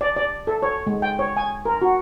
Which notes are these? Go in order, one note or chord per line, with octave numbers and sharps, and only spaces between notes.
D5
D5
A4
C#5
G#3
G5
C#5
G#5
A#4
F#4